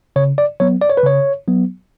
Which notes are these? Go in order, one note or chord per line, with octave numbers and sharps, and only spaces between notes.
C#3 C#5
D5
F#3 B3 C#5
D5
C#5
B4
C#3 C#5
F#3 B3